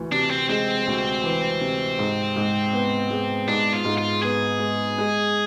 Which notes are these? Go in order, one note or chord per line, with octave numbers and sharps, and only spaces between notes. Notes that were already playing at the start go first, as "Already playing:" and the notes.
Already playing: D2 E3
C3 D4
C4
G#3 C4
D2
E3
C3
G#2
G#2
B3
G#3
G#2 D4
F4
G#2
F4
B3 G#4
G#3
G#3